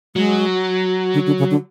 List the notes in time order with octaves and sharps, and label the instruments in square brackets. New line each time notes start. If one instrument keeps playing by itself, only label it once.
[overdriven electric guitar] F#3 [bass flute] G#3
[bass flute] D3
D3
C#3
D3